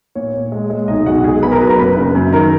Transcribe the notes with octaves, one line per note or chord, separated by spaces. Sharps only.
A#2 C#5
A#2
G#3
G#3
B1 D#4 D#5
B1 F#4 F#5
B1 G#4 G#5
B2 B4 B5
A#4 A#5
F#3 B4 B5
A#4 A#5
F#1 B4 B5
C#3
F#2
D#3 A#4 A#5